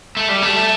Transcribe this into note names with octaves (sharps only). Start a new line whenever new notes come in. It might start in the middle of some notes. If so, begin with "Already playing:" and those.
A3
G3
A3